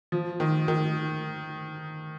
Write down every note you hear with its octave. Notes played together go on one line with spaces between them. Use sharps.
F3
D#3
D#3